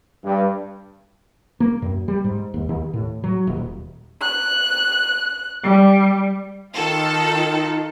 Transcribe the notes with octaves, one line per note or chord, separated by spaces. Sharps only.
G2
A#3
F#2
G3
G#2
D#2
D#2
A2
F#3
D#1
F#6
G3
D#3 D#4 F4 A4